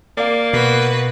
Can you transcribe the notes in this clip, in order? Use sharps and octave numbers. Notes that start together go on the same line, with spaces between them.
A#3 D5 F5
B2 F#4 B4